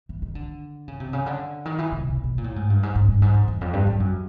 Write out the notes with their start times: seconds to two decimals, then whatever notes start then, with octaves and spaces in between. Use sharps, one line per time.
0.09 E3
0.22 D#3
0.35 D3
0.88 C#3
1.00 C3
1.13 C#3
1.26 D3
1.65 D#3
1.78 E3
1.92 C#3
2.04 B2
2.24 B2
2.38 A#2
2.44 A2
2.56 G#2
2.70 G2
2.83 G#2
2.95 G#2
3.08 G2
3.22 G#2
3.34 F2
3.48 E2
3.61 F2
3.73 G2
3.87 G2
4.00 F#2